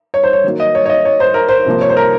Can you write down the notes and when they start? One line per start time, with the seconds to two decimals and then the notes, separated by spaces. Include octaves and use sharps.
0.14 C#5
0.23 C5
0.33 C#5
0.44 D#3 F#3 A#3
0.60 D#5
0.75 C#5
0.86 C#5
0.89 D#5
1.05 C#5
1.20 C5
1.34 A#4
1.49 C5
1.66 C3 F3 A#3
1.81 C#5
1.89 C5
1.97 A#4